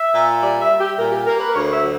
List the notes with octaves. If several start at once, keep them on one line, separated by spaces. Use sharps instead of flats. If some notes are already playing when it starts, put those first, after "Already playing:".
Already playing: E5
A#2
G3 D5
E5
G3
G4
A#2 A#4
G4
A#3 A#4
B4
D2 C#5
E5
F#3